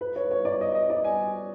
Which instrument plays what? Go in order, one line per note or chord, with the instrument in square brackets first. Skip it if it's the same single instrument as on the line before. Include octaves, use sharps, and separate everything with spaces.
[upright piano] B4
C#5
C#5
D5
D#5
D#5
D5
G#5